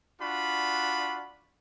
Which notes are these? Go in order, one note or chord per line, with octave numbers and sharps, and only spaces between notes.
D4 F4 F#4 B5